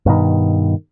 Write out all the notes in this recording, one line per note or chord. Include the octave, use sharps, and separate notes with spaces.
G2 B2 D#3